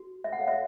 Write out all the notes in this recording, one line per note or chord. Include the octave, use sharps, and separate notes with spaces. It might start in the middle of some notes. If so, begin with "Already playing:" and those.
Already playing: F#4
E5
F#5
A4 C#5 F5
E5